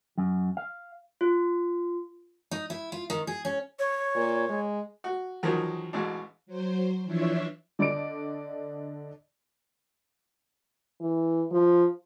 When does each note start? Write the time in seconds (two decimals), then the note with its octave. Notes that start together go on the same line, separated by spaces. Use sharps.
0.18 F#2
0.57 F5
1.21 F4
2.51 D#4
2.70 E4
2.92 F4
3.10 D#3
3.27 G#4
3.45 C#4
3.79 C#5
4.15 A#2
4.49 G#3
5.04 F#4
5.43 E2 D#3 F3 F#3
5.93 A1 B2 G#3 D4
6.46 F#3 C5
7.04 E3 F3 D4 C#5 E5
7.79 D3 D5 D#5 D6 D7
11.01 E3
11.51 F3